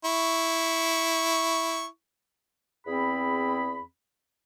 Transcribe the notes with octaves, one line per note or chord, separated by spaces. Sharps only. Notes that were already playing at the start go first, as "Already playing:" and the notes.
E4 C#6
E2 C4 G#4 B5